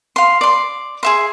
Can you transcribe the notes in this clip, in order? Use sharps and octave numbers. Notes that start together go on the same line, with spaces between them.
F5 C6
D5 C6
G#4 E5 C6